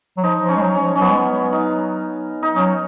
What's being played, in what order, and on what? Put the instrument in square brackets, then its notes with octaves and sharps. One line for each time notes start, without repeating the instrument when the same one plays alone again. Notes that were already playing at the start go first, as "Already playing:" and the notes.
[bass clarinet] F#3
[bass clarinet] F3 [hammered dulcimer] D#4
[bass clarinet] F3
[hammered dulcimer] C#4
[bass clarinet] G#3
F#3
[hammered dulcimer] C#4
[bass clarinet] F3
[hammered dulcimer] C#4
[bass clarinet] F#3 [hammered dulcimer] B3
[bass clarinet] G#3
F#3
[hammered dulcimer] D#4
D#4
[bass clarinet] F#3 [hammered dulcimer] C#4